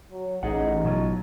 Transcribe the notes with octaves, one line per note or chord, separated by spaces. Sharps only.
F#3
A1 D#4 G#4 D#5 F#5
B2 F#3 F4